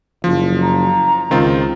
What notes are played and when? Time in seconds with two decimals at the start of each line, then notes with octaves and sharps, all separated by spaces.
0.24 F#1 F3
0.62 A#5
1.31 C#2 D#3 C4 F4